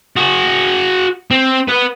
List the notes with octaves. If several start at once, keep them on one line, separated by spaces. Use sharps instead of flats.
F#4 G#4
C4
B4 F#5